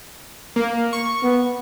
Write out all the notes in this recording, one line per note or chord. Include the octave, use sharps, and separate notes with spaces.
A#3
C#6
B3